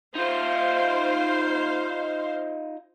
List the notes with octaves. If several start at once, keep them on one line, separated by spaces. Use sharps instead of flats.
D#4 F4 C5 F5